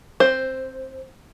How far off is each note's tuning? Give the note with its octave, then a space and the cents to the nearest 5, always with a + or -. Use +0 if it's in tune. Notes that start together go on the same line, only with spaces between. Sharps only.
C4 +15 C5 +0